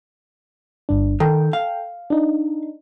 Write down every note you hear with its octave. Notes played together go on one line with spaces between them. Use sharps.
G1 G2 D4
D#3 A4 G5
F5
D4 D#4